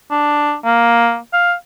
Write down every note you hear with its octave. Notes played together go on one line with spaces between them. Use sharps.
D4
A#3
F5